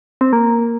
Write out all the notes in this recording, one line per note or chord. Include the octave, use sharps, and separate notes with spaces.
C4
A#3